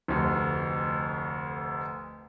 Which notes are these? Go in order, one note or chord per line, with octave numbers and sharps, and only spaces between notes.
F1 D2